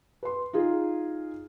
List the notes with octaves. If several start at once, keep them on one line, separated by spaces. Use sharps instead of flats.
B4 C6
D#4 F4 G#4